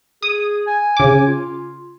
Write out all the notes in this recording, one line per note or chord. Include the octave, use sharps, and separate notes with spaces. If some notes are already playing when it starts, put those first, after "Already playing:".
G#4 D#6
G#5
C#3 D6
F4